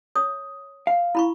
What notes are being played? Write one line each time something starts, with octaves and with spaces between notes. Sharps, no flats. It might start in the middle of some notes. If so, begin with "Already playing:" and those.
C#5 D#6
F5
E4 B5 C#6